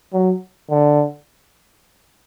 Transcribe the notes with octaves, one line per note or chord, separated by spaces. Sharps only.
F#3
D3